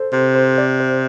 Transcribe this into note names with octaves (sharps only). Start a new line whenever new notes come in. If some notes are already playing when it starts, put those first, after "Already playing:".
Already playing: A4 C5
C3 C5
C5
D5
C5